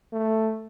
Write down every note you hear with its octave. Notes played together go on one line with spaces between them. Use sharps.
A3